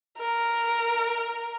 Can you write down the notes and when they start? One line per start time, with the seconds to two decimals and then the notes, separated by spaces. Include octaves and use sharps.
0.19 A#4